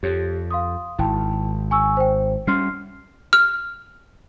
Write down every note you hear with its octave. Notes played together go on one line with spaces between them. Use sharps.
F2 G4 C#5
F5 C6 D#6
G#1 E4 G5 A5
G#5 C#6 E6
C5 G5
G3 C#4 C6 F6 C7
F6